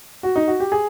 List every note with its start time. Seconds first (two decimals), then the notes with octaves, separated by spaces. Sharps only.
0.23 F#4
0.36 D#4
0.48 F#4
0.60 G4
0.72 G#4